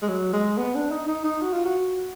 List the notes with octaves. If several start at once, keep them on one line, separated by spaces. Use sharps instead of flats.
G#3
F#3
G#3
B3
D4
D#4
D#4
D#4
F#4
F4
F#4